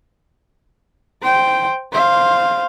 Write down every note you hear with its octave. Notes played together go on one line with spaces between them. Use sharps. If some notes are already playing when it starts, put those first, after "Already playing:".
C5 G5
C5 F5